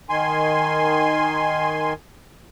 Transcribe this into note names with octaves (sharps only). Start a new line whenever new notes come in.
D#3 G#5 C6